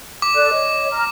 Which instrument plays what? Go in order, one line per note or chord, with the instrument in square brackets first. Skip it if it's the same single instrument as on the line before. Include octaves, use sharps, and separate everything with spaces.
[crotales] D6
[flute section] A4 D5 F#6
C#5 D#5
A#5 F6